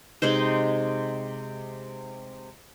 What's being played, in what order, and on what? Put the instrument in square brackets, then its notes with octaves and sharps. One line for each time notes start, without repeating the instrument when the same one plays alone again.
[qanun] C3 G#3 D#4 C5